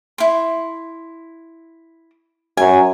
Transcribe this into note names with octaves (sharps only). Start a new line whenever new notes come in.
E4 C6
F#2 G#5